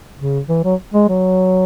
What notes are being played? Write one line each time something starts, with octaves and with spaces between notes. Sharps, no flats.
C#3
E3
F#3
G#3
F#3